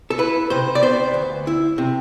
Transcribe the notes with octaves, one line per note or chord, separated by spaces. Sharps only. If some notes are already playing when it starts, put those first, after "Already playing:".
A4
E4 B4
C3 C5
D5
B3 C5
D2
E4
C3